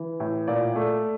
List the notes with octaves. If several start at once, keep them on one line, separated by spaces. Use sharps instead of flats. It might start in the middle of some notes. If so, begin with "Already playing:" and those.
Already playing: E3
A2
A#2 D5
A3